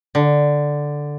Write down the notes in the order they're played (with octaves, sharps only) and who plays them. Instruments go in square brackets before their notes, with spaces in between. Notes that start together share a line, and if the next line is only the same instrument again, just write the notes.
[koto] D3